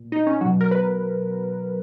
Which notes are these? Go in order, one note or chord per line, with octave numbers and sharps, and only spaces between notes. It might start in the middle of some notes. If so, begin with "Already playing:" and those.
Already playing: A#2
D#4
C#4
B2 F#3 F#4
A#4
B4